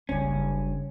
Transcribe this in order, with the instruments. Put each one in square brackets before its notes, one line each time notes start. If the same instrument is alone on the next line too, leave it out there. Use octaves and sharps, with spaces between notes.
[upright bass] F#1 D4 [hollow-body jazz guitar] G2 C#4